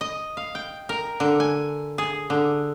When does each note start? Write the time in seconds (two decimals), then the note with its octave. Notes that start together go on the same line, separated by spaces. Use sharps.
0.01 D#5
0.37 F5
0.55 G5
0.89 A#4
1.20 D3
1.40 G#5
1.98 G#4
2.30 D3